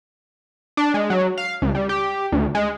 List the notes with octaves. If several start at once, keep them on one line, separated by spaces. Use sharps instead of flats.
D4
G#3
F#3
F5
C#2
G3
G4
D2
G#3